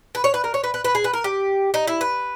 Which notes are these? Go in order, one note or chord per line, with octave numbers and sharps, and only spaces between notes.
B4
C#5
B4
A#4
C#5
B4
B4
B4
G#4
B4
A#4
G4
D#4
E4
B4